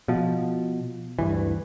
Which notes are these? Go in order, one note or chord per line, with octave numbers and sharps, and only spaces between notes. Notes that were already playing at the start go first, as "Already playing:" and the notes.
B2 F3
D2 G2 E3